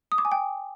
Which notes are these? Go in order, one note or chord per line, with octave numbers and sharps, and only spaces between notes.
D#6
D6
G#5
G5